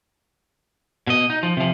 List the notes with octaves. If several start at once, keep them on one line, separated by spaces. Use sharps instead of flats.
B2 D#5
D#4
F3
C3 F3